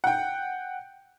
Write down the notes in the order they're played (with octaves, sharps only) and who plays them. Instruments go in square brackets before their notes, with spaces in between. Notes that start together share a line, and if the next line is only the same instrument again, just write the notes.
[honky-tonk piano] F#5 G5